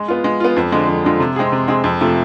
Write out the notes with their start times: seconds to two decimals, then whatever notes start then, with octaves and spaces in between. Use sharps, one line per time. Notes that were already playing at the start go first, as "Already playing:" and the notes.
Already playing: G#3
0.08 B3 F4
0.24 G#3
0.40 B3 F4
0.56 F2
0.72 D3 F3 G#3
0.88 F2
1.04 D3 F3 G#3
1.20 C3
1.36 G#3 C4 G#4
1.52 C3
1.68 G#3 C4 G#4
1.84 F2
2.01 C3 F3 A3